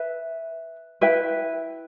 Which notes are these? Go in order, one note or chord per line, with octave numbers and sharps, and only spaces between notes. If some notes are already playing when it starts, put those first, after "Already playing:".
Already playing: B4 E5
E4 B4 E5 G5